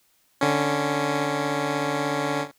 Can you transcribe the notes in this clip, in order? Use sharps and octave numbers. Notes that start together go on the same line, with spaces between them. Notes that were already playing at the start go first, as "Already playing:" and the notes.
D3 C#4